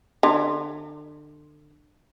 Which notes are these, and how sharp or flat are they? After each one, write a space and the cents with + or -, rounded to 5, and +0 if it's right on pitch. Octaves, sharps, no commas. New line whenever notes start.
D3 +30